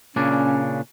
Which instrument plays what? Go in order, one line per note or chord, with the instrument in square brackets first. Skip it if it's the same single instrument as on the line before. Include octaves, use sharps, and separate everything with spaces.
[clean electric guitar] A#2 C#3 D4 [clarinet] C#4